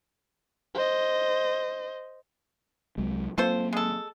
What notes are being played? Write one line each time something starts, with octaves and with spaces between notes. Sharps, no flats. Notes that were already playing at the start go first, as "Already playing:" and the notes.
C5 D#5
C2 F#3 G#3
F#3 A#3 C4 F4 A4 C5
G#3 A4